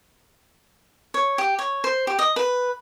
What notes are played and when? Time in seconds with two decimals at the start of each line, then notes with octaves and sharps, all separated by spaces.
1.14 C#5
1.38 G4
1.59 C#5
1.84 C5
2.07 G4
2.19 D#5
2.36 B4